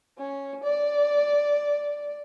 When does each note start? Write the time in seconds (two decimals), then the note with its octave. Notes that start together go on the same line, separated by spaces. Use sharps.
0.18 C#4
0.64 D5